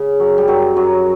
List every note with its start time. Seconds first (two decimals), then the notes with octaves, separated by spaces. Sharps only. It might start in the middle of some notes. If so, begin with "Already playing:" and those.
Already playing: C#3
0.20 F#2 F#3
0.38 G3
0.48 F#2 F#3
0.76 F#2 F#3